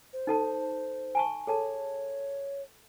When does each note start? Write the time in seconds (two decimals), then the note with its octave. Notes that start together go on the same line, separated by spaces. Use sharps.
0.13 C5
0.27 D#4 A4 A5
1.15 G#5 A5 C#6
1.47 G#4 A4 C#5 A5